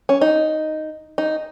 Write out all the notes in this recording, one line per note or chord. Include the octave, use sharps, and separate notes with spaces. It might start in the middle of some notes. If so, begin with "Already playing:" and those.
C#4
D#4
D#4